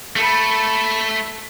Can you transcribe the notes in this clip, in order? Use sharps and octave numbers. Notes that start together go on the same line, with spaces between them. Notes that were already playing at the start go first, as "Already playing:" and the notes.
A3 A4 B5